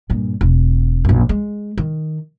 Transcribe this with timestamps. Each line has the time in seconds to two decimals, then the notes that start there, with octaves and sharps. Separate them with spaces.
0.10 G2 A#2
0.41 E1
1.05 A#1 F#2
1.29 G#3
1.78 D#3